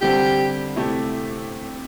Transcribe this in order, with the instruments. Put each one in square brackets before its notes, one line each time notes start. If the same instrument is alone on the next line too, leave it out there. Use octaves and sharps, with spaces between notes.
[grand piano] D3 G3 C4 [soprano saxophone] G4
[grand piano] C3 A3 E4 G4